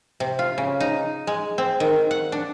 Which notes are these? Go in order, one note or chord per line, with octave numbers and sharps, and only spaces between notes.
C3
F4
C#3
D#4
G#3
C4
D#3
F#5
D4